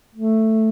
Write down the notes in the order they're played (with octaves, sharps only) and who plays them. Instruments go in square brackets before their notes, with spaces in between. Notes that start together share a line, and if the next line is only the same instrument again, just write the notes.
[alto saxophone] A3